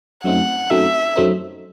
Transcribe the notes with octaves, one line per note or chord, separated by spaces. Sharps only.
F#2 F#3 A3 C4 D#4 F#5
F#2 F#3 A3 C4 D#4 E5
F#2 F#3 A3 C4 D#4